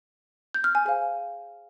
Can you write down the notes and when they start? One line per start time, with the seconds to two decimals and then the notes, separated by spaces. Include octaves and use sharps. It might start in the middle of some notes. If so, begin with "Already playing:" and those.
0.54 G6
0.64 F6
0.75 G#5
0.85 G#4 C5 F5 G#5